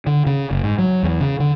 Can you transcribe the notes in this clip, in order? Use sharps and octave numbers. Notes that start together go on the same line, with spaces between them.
D3
C#3
F#1
G#2
F#3
E2
C#3
D3